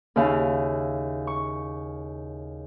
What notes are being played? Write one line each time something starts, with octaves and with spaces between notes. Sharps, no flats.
D#2 C#3 E4 F5
C#6